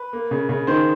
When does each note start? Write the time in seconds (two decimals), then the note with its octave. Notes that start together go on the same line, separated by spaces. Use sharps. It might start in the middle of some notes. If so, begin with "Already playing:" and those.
Already playing: B4
0.13 A#3
0.31 C#3
0.49 C#3
0.67 D#3 C5